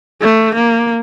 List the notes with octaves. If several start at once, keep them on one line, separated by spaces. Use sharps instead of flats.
A3
A#3